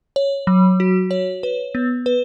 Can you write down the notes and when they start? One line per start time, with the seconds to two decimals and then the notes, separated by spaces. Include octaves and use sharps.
0.16 C#5
0.47 F#3
0.80 F#4
1.11 C#5
1.43 B4
1.75 B3
2.06 B4